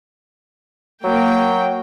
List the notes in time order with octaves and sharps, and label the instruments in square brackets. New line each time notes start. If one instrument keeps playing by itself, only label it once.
[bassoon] F#3 [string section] A#3 G5